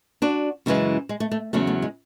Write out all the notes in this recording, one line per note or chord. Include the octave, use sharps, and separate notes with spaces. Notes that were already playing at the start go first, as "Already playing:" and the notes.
D4 F#4
F#2 C#3 E3 G#3
G#3
A3
A3
E2 C#3 F#3 A3
A3
G#3